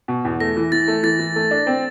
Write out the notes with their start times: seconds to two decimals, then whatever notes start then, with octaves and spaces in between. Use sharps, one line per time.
0.08 B2
0.25 E2
0.40 A3 A#6
0.57 E3
0.72 E3 A6
0.88 A3
1.03 E3 A6
1.19 E3
1.36 A3
1.51 D4
1.67 C4